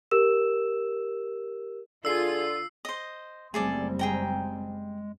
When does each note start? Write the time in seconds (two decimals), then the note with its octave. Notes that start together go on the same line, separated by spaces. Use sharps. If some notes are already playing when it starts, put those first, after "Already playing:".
0.11 G4 A#4 E6 E7
2.05 D3 F4 G#4 E6 C7
2.85 C5 D#5
3.54 F#1 G3 A3 C4 G#4 A4 D5
3.99 G#3 G#4 G5 A#5